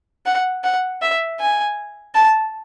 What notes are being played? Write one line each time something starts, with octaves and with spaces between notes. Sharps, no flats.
F#5
F#5
E5
G#5
A5